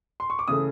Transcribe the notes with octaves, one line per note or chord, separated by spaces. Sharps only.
C6
C#6
D6
C#3 E3 A3 D#6